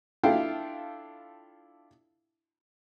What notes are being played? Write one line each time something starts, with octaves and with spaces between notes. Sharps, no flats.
D4 E4 F4 A4 F5 G5